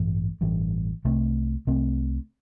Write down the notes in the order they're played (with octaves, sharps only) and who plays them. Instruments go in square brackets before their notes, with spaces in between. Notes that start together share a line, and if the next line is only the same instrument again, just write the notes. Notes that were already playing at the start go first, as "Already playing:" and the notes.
Already playing: [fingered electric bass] A1 G2 E3
A1 G2 E3
C2 C3 A3 C4
C2 C3 A3 C4